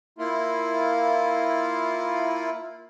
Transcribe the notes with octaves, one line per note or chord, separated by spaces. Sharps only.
A#3 E4 F4